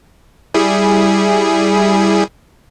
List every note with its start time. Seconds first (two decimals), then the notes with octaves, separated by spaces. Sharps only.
0.54 G3 E4 G#4